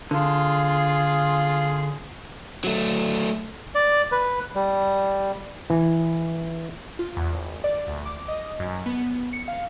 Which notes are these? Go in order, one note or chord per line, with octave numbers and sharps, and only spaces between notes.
D3 F4 G#4
F#3 A3
D5
B4
G3
E3
F4
E2
G#1
D5
D2
D6
D#5
F#2
B3
C#7
F5